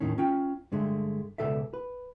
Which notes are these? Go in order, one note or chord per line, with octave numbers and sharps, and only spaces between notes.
D#2 A2 D#3 C#4
C#4 F4 G5
G2 D3 G#3 A3
C#2 F#2 B2 A4 D5 E5
B4